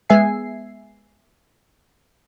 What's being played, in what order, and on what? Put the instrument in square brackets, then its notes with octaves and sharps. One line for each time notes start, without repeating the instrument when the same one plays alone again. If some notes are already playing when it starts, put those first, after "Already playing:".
[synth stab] G#3 B3 E5 G#5 C7